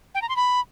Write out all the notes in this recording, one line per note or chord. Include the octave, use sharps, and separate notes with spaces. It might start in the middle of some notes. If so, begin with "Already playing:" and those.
G5
A#5
C6
B5